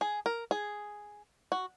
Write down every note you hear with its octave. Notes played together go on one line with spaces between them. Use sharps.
G#4
A#4
G#4
F#4